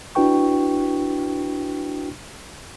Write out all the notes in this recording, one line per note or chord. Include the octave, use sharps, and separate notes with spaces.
D4 E4 F#4 B4 G5 C#6